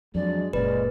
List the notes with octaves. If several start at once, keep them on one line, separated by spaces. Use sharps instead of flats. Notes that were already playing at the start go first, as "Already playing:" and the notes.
F2 F#3 G#3 D4 D5
F#1 A#2 C#3 G#3 B4 D5